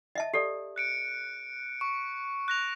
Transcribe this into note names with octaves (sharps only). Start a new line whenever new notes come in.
D#5 E5 A5
G4 A4 D5
F#6 C#7 D7
C#6
F#6 A#6 F7